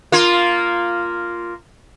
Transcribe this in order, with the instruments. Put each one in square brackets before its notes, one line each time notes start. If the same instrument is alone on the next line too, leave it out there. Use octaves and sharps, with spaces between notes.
[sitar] A#3 F4